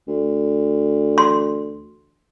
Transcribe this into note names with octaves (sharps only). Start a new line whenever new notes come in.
D2
C6